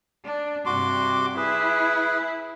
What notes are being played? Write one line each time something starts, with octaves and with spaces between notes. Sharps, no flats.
D4
G2 C3 F#4 C6 D6
E4 G#4 B4